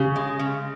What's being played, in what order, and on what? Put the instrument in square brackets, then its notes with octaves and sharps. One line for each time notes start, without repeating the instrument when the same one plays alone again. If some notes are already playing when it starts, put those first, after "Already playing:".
Already playing: [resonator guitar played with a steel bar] C#3 [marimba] G4
[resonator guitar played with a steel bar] G#3
C#3